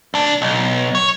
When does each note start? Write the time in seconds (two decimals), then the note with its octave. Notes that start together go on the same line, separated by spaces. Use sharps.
0.14 C2 D4
0.42 B1
0.95 C#5